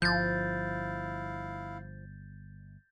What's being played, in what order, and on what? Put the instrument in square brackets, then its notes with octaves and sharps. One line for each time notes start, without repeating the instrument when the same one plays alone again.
[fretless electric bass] G1 [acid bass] F3 [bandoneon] E4 F5 [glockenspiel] G6 A6